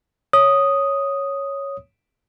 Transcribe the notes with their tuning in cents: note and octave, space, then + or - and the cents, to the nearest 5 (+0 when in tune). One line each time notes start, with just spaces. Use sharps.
C#5 +0 D#6 +0